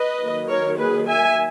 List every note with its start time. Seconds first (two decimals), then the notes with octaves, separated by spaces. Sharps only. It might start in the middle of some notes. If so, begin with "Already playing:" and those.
Already playing: B4 D#5
0.19 D#3 F#3 A#3
0.48 A#4 C#5
0.78 G#4 B4
1.07 E5 G#5